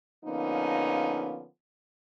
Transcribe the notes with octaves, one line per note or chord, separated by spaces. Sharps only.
D3 F3 A#3 B3 C#4 D#4